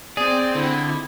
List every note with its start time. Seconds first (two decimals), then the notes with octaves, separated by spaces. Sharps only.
0.17 C4 G#4 D5
0.55 D3 E4